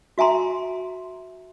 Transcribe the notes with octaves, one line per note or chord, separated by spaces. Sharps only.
F#4 E5 G#5 A#5 C6